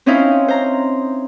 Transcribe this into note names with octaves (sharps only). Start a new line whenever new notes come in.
C4 C#4 D#4 E4 C5 F5
C5 A#5